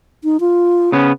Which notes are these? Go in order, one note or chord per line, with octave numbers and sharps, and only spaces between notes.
D#4
F4
C#3 B3 C#4